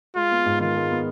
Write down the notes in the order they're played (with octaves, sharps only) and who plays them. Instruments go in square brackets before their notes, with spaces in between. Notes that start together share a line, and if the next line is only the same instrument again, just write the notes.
[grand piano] G#3 [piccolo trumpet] F4
[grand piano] B3
G#2
[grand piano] D#3 [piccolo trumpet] F4
[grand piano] G#3
B3